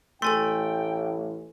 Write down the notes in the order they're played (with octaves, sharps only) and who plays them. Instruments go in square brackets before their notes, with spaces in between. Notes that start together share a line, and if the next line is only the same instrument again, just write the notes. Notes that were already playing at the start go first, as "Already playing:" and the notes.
[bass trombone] A1 [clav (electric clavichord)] A3 [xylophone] A4 G#5 C6 [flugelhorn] G5